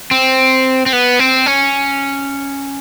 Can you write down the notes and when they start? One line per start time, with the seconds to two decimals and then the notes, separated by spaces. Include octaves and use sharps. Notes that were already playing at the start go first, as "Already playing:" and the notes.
0.11 C4
0.86 C4
0.93 B3
1.19 C4
1.46 C#4